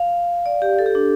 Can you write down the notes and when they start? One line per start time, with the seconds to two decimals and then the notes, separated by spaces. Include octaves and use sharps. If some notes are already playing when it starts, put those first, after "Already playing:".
Already playing: F5
0.46 D5
0.62 G4
0.79 A4
0.86 G4
0.95 D4